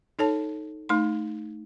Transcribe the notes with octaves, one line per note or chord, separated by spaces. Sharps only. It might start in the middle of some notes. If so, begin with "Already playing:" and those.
D#4 A4 C#5 A5
A3 D#4 C6